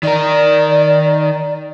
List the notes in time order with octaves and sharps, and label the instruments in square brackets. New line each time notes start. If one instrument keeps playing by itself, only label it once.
[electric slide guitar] D#3 A#4 [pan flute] D5